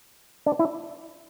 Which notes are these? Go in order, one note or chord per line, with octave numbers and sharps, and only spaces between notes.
D4
E4